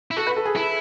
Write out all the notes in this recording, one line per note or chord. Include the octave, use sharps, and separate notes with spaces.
E4
F#4 A4
B4
A4
G#4
E4 A4